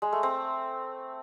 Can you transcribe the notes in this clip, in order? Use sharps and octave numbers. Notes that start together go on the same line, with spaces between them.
G#3
A3
C4